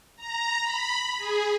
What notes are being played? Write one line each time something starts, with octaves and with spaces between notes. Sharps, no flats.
A#5
B5
G#4